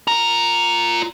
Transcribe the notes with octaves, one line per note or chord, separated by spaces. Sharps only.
F4 A#5